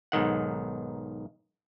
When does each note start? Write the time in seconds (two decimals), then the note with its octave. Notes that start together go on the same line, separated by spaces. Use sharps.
0.12 B1 G#2 D#3 F#5